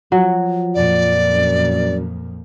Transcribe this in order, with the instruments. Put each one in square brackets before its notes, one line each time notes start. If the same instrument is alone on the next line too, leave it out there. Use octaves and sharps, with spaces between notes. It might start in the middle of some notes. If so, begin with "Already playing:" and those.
[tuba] F3 [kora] F#3
[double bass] F2 A#2 [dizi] D5
[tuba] F#2